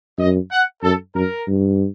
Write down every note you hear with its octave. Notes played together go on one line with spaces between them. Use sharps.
F#2 D#5
F#5
F#2 A4
F#2 A#4
G2